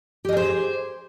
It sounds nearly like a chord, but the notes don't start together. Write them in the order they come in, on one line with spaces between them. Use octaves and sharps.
G4 D#5 G#4 C5